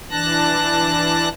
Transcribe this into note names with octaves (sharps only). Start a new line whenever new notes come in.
E3 D4 A5 F#6 A#6